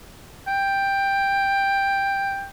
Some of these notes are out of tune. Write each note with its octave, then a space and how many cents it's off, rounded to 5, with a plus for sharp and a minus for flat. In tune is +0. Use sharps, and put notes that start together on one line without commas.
G5 +10